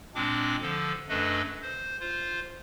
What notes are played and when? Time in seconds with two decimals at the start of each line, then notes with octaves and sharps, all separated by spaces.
0.15 A#2 G#3 C4 D4 D6
0.62 D3 F3 A4
1.09 F#2 A3 D4 A4 B4 D#5
1.62 C5
2.00 F4 C5